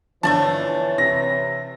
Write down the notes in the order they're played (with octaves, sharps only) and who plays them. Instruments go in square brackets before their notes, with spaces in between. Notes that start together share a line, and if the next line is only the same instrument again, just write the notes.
[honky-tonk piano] G1 F3 D4 [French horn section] E3 C#5 [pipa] A3 D5 A5
[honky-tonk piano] C3 [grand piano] A#6